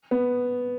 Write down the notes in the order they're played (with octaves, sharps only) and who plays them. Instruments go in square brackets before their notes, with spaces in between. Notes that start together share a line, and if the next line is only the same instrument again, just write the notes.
[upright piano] B3